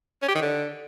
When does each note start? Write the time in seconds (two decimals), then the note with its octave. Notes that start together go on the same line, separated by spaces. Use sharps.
0.22 C#4
0.29 G4
0.35 D#3
0.42 D3